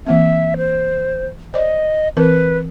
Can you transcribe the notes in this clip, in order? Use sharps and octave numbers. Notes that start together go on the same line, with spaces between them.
E3 A#3 C4 E5
C5
C5 D5 D#5
E3 C4 A#4 B4